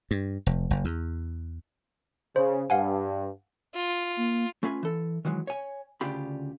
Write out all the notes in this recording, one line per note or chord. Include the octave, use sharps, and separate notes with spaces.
G2
F1
F#1
E2
C#3 C5
G2 F5 F#5 G#5
F4
A#3
A3 C#4 F4 B4 G#5
E3 A4
D#3 E3 F#3 G#3
C#5 G#5
D2 C#3 D4 F4 G4 B5